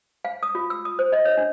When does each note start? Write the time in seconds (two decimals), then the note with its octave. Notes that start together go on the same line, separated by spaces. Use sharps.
0.25 F5
0.43 D#6
0.55 F4
0.70 E6
0.85 D#6
0.99 C5
1.12 D#5
1.25 C#5
1.37 D4